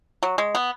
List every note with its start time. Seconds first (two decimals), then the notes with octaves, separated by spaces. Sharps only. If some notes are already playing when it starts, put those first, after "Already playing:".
0.23 F#3
0.38 G#3
0.55 B3